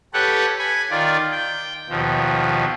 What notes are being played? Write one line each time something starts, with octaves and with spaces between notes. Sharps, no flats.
G4 A4 B4 C#5 F#5
G#5 B5
D#3 F4 D5
G5
D#2 B2 F3